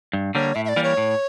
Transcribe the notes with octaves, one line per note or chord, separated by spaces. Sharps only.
G2
D3 G3 A#3 C#5
A2 E5
E5
D5
E3 G3 A#3
C#5
A2